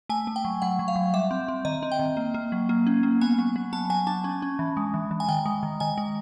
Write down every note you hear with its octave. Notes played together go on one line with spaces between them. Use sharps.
A3 G#5
A3
G5
F#3
F#3 F#5
F#3
F5
F#3
G3 E5
C4
C4
D#3 D#5
C4
G5
D#3
A#3
A#3
F#3
A#3
C#4
A#3
B3 G#5
F#3
F#3
B3 A5
F#3 G#5
D4 A5
C#4
C#4
E3
G#3
E3
E3
G#5
D#3 G5
G#3
D#3
D#3 G#5
G#3